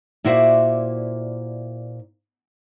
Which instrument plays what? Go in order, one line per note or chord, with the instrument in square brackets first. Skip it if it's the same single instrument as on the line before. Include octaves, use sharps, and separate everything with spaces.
[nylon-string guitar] A#2 E4 F#4 C5 D5 E5